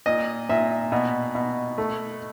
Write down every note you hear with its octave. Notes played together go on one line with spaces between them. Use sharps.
A#2 D#5
A#2 E5
B2
B2
A3